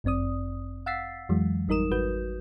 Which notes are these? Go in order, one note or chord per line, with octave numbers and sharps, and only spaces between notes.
G1 F#2 C4 D5 D#6
F5 F#5 E6 A6 B6 C7
F2 E3 F#3 G#3
G#1 G3 D#4 A#4 D#6 E7
G#1 F#4 B4 G6